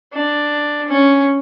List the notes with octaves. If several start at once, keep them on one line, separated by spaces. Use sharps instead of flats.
D4
C#4